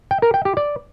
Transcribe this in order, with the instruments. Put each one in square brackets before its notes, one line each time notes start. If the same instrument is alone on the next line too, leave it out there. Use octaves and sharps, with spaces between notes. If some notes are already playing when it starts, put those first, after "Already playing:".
[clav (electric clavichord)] G5
A#4
G5
G4
D5